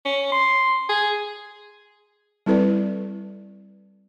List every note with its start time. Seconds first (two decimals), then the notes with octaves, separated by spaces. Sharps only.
0.05 C#4
0.32 C6
0.89 G#4
2.46 G3 C4 E4 A4 B4 D5